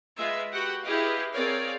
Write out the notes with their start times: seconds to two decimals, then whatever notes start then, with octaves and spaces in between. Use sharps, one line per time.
0.17 G#3 F4 B4 E5
0.52 F#4 G4 B4 F#5 G5
0.83 E4 G4 G#4 B4 D#5 F5
1.34 C4 G#4 A#4 C#5 D5 F5